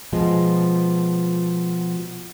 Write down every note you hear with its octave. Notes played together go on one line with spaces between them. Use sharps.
B2 F3 G#3